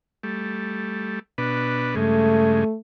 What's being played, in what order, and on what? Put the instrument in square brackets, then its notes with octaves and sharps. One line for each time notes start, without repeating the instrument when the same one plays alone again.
[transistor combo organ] G3 A3
B2 D4 B4
[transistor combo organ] G2 C#3 G#3 [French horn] A3